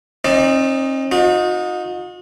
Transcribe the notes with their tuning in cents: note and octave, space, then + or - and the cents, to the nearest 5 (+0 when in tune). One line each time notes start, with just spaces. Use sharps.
C4 +45 D#4 +0 D5 +0
D#4 +0 F#4 -45